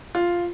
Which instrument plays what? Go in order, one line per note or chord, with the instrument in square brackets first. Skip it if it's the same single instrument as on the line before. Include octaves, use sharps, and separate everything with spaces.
[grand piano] F4